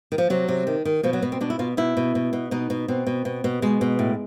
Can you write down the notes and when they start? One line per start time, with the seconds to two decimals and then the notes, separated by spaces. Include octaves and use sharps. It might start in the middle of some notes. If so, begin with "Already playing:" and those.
0.12 D#3
0.18 F3
0.30 C3 F#3
0.48 C3
0.67 D#3
0.85 D#3
1.03 B2 F3
1.13 F#3
1.22 B2 B3
1.32 C4
1.41 B2 D4
1.50 E4
1.59 B2 F4
1.77 B2 E4
1.97 B2
2.15 B2
2.33 B2
2.51 B2 D#4
2.70 B2
2.88 B2 C4
3.07 B2
3.25 B2
3.44 B2
3.62 B2 G#3
3.81 B2
3.99 A2